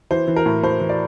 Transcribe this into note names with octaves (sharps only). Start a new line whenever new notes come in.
E3 C5
E3
A#4
A2
A2 C5
E3
D5